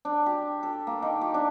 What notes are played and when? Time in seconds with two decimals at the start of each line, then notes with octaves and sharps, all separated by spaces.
0.05 D4
0.26 G4
0.63 A4
0.87 A#3
1.02 D#3
1.21 G4
1.34 D4